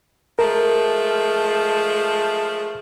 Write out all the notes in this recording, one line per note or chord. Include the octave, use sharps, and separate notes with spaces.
F3 G#3 A3 A#4